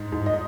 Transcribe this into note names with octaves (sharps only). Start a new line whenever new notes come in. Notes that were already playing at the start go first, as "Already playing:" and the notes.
Already playing: G#2
G#2
D#5